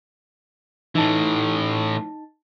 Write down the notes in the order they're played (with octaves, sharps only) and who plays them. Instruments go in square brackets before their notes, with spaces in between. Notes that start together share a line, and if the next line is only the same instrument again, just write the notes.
[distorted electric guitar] A2 E3 [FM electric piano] D#4 A5